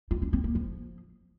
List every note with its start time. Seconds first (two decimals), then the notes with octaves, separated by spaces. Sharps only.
0.11 F4
0.22 C#4
0.33 C4
0.44 A#3
0.55 F3